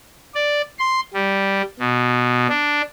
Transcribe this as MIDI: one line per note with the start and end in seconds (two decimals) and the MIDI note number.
0.35 0.62 74
0.79 1.00 84
1.14 1.62 55
1.79 2.47 47
2.49 2.82 62